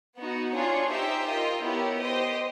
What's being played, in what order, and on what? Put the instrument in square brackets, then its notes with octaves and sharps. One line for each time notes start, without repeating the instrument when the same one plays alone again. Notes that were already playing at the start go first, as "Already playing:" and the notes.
[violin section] B3 D#4 F#4
D4 F4 G#4 C#5
D#4 G4 C5 E5 G5
F4 A#4 D#5 G5
B3 E4 G4 A#4 C#5
G4 C5 D#5 G5